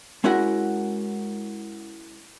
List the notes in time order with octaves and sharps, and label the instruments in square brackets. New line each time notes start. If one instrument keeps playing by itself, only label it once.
[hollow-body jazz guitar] G#3 C#4 E4 F#4 A#4 F#5